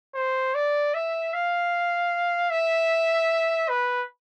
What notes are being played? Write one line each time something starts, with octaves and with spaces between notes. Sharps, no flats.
C5
D5
E5
F5
E5
B4